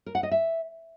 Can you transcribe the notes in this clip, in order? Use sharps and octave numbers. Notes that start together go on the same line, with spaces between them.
A#4
F#5
D#5
E5